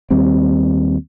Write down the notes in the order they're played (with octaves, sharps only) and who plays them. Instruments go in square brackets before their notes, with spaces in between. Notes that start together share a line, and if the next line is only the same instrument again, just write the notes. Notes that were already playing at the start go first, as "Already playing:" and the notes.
[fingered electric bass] D#2 G3 C4